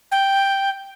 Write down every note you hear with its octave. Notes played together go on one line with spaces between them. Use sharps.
G5